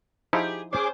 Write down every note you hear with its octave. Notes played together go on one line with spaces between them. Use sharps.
F3 D#4 E4 G4 G#4
C#4 G#4 C5 D6